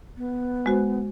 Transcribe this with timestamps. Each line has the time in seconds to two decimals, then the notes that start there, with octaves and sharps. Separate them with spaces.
0.17 B3
0.66 G#3 F#4 C5